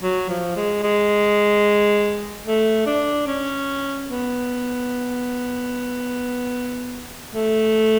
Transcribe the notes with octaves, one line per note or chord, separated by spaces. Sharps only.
F#3
F3
G#3
G#3
A3
D4
C#4
B3
A3